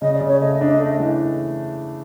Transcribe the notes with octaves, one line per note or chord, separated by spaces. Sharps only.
C#3 D#5
D5
C#3
C#5
A3 D#5
D4
A3
E3